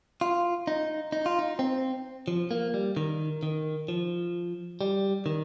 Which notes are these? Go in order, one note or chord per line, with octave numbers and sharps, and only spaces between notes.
F4
D#4
D#4
F4
D#4
C4
F3
A#3
G3
D#3
D#3
F3
G3
D#3